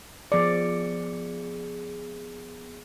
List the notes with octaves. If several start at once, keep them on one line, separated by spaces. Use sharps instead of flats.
F3 B3 G#4 D5 C#7